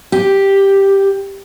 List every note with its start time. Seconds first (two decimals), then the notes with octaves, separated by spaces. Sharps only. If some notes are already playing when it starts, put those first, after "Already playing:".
0.12 G4